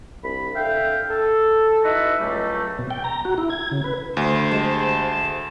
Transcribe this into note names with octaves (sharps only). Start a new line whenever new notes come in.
C2 D4 B5
D3 E5 F5 G5
A4
D#4 E4 F#4 B4 E5
C#2 F#3 G3 A3
B2
G5
A#5
F#4
E4
G#6
C#3
B4
D2 C5
G#3 G4 A5